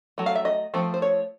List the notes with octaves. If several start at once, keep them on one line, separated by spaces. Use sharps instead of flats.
F#3 A3
F5
E5
D#5
F3 A3 C4
C5
C#5